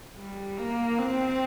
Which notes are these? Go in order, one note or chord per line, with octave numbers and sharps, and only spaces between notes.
G3
A#3
C4